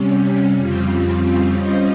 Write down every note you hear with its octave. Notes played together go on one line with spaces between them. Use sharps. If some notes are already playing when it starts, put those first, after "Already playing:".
Already playing: C3 G3 C#4
F2 C#3 G3 C4 F4
G3 C#4 F4 C5 D#5